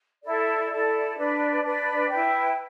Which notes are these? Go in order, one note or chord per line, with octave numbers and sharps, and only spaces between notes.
E4 A4 D5
E4 A4 D5
D4 B4 D5
D4 B4 D5
E4 B4 G5